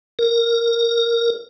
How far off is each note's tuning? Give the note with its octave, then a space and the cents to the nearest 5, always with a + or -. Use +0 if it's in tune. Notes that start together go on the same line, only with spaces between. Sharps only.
A#4 -5